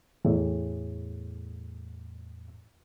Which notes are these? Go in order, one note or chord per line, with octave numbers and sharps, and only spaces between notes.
E2 A2